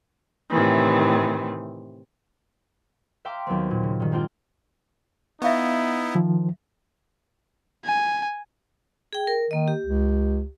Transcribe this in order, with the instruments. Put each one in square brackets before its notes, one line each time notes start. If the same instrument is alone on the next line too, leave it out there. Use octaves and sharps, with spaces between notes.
[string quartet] A2 C3 D#3 E3
[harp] E5 F5 G5 A#5 C6 D6
D#2 F#3 B3 C4
A#2
C#3
G2 D#3
G#3 A#3 C4 D4 F4 G5
[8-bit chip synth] B3 [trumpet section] D#4 E4 [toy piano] E5 F5 C#6
[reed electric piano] D#3 F3
[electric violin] G#5
[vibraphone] G#4 G5
A#4
[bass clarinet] D#3 [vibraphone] A#3 D#5
[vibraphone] G4
[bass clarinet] C#2